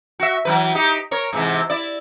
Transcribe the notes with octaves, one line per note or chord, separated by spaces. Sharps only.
F#4 E5
E3 F#3 B4
D#4 G4
A#4 C#5
G#2 C3 E3
E4 D5